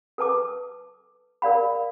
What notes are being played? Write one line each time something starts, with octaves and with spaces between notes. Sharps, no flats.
A4 B4 A5 D6
A#4 D5 F5 B5